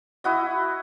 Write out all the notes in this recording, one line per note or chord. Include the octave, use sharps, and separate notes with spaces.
E4 F#4 D#5